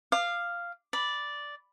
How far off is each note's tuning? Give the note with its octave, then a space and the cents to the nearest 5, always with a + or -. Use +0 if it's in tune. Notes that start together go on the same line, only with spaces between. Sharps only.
F5 -5 D6 +35
D5 -5 B5 +0